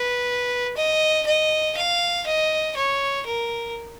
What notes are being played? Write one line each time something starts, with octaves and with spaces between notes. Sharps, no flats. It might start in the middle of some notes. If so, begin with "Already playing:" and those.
Already playing: B4
D#5
D#5
F5
D#5
C#5
A#4